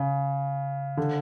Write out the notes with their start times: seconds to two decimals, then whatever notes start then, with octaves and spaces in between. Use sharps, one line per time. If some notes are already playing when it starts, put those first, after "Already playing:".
Already playing: C#3
0.97 D3